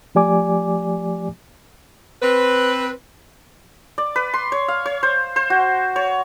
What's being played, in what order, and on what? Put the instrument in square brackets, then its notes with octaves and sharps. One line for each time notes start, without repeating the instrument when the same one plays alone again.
[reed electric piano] F3 A3 G4 D5 G#5 D6
[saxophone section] C4 B4
[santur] D5
B4
C6
C#5
F5
C#5
C5
C5
F#4
C#5